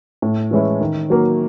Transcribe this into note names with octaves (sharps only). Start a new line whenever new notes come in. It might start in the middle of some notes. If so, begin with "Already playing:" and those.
A2
E3 G#3 C#4 E4
D#3
F#3 A#3